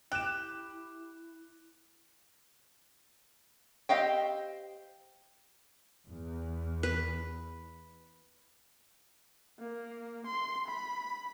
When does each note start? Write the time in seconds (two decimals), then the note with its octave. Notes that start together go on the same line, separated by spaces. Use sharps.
0.12 E4 G4 F#6 E7
3.89 C4 G4 D#5 F5 G5
6.08 E2
6.83 B4
9.59 A#3
10.26 C6
10.67 B5